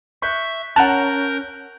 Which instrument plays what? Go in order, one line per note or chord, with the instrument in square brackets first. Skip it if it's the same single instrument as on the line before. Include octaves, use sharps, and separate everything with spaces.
[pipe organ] E5 [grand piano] C#6 F#6 G6
[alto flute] C#4 [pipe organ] A#4 G6 [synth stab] F#5 A5 [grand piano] A#5 F#6 F7